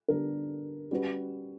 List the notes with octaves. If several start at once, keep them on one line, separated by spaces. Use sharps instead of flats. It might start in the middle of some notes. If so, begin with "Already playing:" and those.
D3 G3 B3 D4 A#4
G3 C#4 F#4 B4